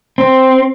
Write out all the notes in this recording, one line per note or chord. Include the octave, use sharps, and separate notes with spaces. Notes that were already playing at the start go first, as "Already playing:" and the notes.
C4